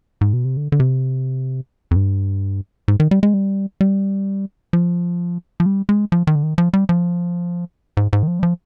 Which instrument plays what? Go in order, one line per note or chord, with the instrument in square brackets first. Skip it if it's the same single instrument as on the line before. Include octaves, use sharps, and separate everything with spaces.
[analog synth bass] G#2
B2
C3
D3
D3
C3
F2
G2
G#2
D#3
G3
G#3
G3
G3
F3
F3
G3
G#3
F3
D#3
D3
D#3
F3
G3
F3
G#2
G#2
D#3
F3
G3
F3